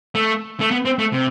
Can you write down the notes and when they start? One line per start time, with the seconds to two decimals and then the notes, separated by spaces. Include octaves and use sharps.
0.15 A3
0.60 A3
0.71 B3
0.85 C4
0.99 A3
1.13 C3